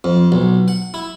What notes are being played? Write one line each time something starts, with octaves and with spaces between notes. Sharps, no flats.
F2
B1
F#5
E4